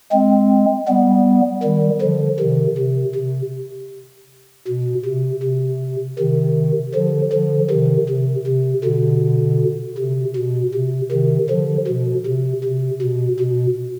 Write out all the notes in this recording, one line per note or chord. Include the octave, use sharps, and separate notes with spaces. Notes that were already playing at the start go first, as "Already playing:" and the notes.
G#3 C4
G3 B3
D#3 G3
D3 F3
C3 D#3
C3
C3
B2
C3
C3
C3 D#3
D3 F3
D3 F3
C3 D#3
C3
C3
B2 D3
C3
B2
C3
C3 D#3
D3 F3
B2
C3
C3
B2
B2